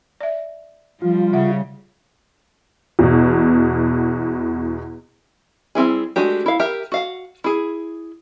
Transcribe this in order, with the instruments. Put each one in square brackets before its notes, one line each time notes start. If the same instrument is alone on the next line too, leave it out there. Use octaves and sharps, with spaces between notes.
[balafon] D5 E5
[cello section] F3 [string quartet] G3 [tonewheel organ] F4
[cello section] C#3 [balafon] E5 F#5
[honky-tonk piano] E2 B2
[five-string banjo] G3 C4 E4 G#4
G#3 A3 D4 F#4 G4
E4 F5
G4 A#4 E5
F#4 F5 F#5
E4 G#4